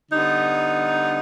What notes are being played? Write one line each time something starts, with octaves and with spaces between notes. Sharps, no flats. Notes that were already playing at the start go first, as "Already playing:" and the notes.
D3 G3 B3 D#4